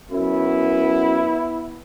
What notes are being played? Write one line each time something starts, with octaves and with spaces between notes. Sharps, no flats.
F#2 B3 E4